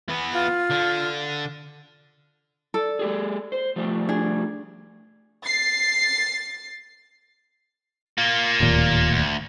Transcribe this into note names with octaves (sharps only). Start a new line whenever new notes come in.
E3 B3
F4
D3
A4 D5
G#3 G4 G#4
C5
F3 G3 A3
D4 G#4
A6 C7
A#3 F4
D1 D#2 A#2
D2